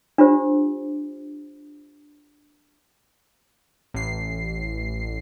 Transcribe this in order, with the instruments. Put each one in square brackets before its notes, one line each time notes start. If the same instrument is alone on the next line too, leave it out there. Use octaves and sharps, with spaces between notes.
[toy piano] D4 F4 G4 C5
[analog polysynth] A1 C7